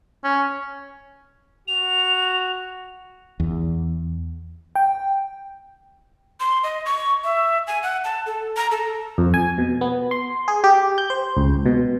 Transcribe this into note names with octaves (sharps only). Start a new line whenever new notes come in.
C#4
F#4 F7
E2
G5
C6
D#5
C#6
E5
G#5
F#5
A5
A4
A#5
A4
F2
G#5
B2
B3
C6
G#4
G4
G6
C5
C#2
B2